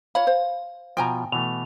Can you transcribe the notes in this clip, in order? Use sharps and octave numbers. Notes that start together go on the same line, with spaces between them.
F4 C#5 F5 B5
C5
B2 F3 G5 G#5 A#5
B2 E3 A3 F7